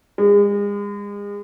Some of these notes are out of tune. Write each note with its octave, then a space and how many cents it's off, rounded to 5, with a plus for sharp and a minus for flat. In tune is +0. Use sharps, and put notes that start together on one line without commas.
G#3 -40